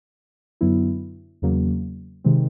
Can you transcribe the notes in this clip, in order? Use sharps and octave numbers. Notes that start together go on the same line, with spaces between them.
F#2 D3 F#3 B3 E4
E2 C#3 F#3 A#3
C3 D#3 G#3 C4